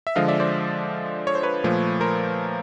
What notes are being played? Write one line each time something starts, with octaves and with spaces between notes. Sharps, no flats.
E5
D3 F3 G#3 D#5 F5
D5 E5
C5 D5
C#5
C5
B4 C#5
A#2 F3 A3
A#4 C5